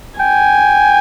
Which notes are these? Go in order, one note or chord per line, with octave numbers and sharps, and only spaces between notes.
G5 G#5